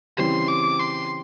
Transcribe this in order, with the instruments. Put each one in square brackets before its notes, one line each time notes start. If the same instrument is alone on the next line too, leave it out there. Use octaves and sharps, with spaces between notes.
[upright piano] C#3 E3 G3 C4 [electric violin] C6
[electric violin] D6
C6